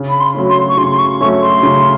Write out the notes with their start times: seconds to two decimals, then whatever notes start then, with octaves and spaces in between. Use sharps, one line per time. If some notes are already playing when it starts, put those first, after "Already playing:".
Already playing: C#3
0.10 B5
0.20 C6
0.35 F#3 A3 C#4
0.49 C6
0.69 C#6
0.77 C#3 C6
0.92 C6
0.99 C#6
1.21 F#3 A3 C#4 C#6
1.42 C6
1.63 C#3